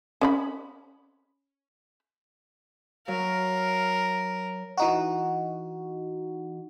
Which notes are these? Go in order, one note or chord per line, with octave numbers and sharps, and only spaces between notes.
C#4 D5 B5
F#3 A#4 F5
E3 D#4 F#4